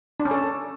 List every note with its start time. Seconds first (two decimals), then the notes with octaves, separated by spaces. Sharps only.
0.20 D4
0.25 C#4
0.31 A4